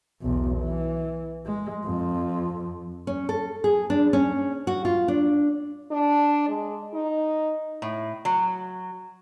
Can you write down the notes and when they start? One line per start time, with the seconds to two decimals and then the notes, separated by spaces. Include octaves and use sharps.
0.22 B1 E2
0.58 E3
1.46 G#3
1.85 F2
3.07 C#4
3.29 A4
3.64 G#4
3.90 D4
4.13 C#4
4.67 F#4
4.85 F4
5.08 D4
5.91 D4
6.48 G#3
6.94 D#4
7.82 A2
8.25 F#3